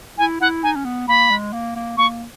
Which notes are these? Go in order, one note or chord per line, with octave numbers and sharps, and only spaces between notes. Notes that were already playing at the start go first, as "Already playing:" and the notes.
E4 G#5
E4 F#5
D#4 G#5
C#4
B3
A#3 B5
G#3
A#3
A#3
A#3 C#6